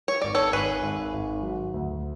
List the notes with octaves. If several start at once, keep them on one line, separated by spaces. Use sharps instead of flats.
C#5
G#1 D5
A4 C#5
G#1 G#4 B4
G#1
G#1
F#3
D2